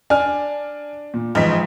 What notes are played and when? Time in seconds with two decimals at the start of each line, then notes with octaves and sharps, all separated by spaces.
0.10 D4 G#5 F6
1.14 A#2
1.35 A1 G#2 F3 D#4 B6